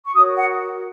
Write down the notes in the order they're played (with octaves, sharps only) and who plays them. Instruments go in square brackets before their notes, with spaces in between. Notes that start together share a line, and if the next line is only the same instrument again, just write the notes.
[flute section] C#6
F#4 A#4 C#5 D#6
F#5